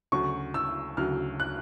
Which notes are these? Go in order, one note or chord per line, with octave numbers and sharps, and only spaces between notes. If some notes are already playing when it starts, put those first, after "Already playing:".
D2 C#3 F#3 C#6
E6
D2 C#3 F#3 F6
F#6